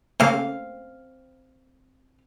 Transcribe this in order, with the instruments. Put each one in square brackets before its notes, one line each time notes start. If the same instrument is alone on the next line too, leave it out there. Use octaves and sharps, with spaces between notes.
[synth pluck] C#3 A3 A#3 [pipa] C4 F5